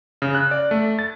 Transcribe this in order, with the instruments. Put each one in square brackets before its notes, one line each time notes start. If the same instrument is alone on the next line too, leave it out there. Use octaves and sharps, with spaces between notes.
[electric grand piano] C#3
F#6
D5
A3
A6